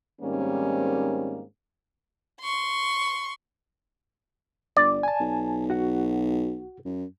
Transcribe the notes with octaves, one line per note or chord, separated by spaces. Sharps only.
G#2 D#3 G3 A#3 C4 C#4
C6 C#6
G1 D5
G#5 A5
B1
F#4 F#5
F#2